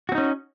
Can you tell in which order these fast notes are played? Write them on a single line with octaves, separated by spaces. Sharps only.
F#4 C4 D#4 C#4